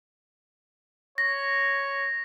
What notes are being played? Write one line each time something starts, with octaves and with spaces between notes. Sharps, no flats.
C#5 A#6